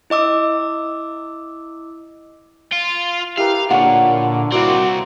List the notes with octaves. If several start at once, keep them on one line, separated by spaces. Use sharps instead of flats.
E4 D#5 D6 E6
F4
E4 G4 A#4 B4 F5
A#2 D3 F4 C#5 F#5
C2 A#3 C4 E4 F#4